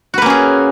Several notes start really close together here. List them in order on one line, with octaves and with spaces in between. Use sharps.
F#4 B4 A#3 C#4 G#4